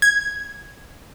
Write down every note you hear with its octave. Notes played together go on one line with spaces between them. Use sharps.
G#6